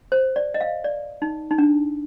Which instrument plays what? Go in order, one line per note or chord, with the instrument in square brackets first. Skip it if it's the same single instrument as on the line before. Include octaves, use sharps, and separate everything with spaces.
[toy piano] C5
D5
D#5
F5
D5
D#4
D#4
D4